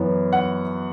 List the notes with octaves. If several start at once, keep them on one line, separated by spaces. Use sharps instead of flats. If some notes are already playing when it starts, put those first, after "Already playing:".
Already playing: F#2 E3 B3
F#5